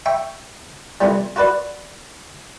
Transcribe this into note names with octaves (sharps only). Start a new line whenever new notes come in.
E5 G5 C#6
F2 C3 E3 F3 G3
F4 F#4 B4 D5